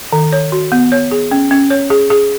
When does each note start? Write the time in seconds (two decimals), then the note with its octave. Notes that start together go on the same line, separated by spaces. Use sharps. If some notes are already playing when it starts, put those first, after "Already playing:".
0.13 D#3
0.33 C#5
0.52 F#4
0.72 B3
0.92 C#5
1.11 G#4
1.31 C#4
1.51 C#4
1.70 C#5
1.90 G#4
2.10 G#4